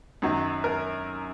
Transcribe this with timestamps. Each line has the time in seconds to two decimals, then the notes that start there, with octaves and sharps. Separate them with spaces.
0.22 F#2 D#3 F#3
0.64 A#4